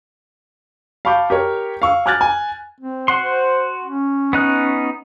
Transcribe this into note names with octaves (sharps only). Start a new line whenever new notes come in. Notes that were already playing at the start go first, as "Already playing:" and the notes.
F5 A5 B5 C#6 D6 G6
G4 A#4 C#5
F5 C#6 E6
G#5 D6 F6 F#6 G#6 A6
G#5
C4
F#4 F#5 C6
C5
C#4
B3 D#4 F#6